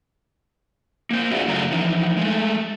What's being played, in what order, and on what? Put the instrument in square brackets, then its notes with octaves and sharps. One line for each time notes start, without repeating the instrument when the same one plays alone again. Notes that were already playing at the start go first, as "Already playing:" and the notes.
[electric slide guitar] A#3 C5
F4 F#4 G#4 D5 E5 F#5
F#2 C#3 A3 A#5
E3 F3 D#4
G#3 A3